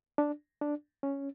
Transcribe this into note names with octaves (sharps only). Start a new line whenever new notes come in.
D4
D4
C#4